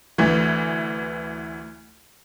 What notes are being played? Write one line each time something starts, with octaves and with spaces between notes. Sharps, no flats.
D2 E3